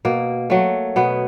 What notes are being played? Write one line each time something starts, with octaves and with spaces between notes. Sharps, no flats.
B2 A#3
F#3 A3
B2 B3